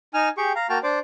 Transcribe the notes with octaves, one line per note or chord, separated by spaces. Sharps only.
D#4 G#5 F6
G4 G#4 G5 C#6
F5 A#5
A#3 F#4 G5 A5 F6
D4 C5 D5 D6